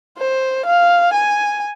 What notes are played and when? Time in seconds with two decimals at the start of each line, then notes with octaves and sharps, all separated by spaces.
0.18 C5
0.66 F5
1.13 G#5